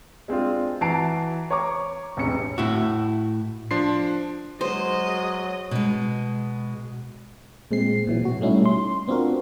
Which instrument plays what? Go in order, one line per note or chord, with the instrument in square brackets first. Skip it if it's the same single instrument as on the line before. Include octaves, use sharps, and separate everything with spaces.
[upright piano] G#3 C4 D4 F4
E3 F#4 A5 A#5 C7 D7
C#5 A#5 C#6 D6
E1 A1 C3 C#7
[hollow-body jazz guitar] A2 E4 F#4
[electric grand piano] F3 D4 C6 C7
[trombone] F#3 [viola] G#3 D#5 [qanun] C5
[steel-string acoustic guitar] B2 G#3
[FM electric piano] A#2 G#3 C4 C7
A#2 E3 F#3
B2 F#4
G3 A3 C#4 D#4 E4
C6
B3 C4 D4 F4 F#4 A#4